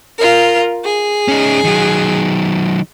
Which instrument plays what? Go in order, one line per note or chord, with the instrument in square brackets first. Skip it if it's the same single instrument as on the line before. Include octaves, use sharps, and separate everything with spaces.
[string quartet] F4 A#4
G#4
[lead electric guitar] C#4 D#4
D#3 F#3